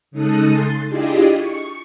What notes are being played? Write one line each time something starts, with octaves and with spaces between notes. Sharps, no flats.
C#3 G#3 D#4 A4 D#6 F#6
C6 A6
D4 E4 F4 G4 G#4 D#5
C#6